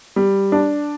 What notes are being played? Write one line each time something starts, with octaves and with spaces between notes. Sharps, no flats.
G3
D4